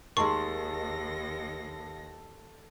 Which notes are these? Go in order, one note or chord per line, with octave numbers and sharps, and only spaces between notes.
D#2 D#3 G#3 A4 C6 C#6 A#6